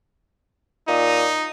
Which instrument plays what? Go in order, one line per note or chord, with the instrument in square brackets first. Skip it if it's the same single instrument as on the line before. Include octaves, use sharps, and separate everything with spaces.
[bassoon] A#2 [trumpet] D#4